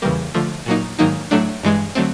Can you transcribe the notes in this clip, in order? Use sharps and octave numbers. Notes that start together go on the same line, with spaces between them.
E2 C#3 E3 G3 A#3
D3 F3 A3
A#2 F#3 A#3 D#4
G#2 D#3 F#3 A#3 D#4
A2 F#3 A3 D4
G2 E3 G#3
D3 F#3 A3 C4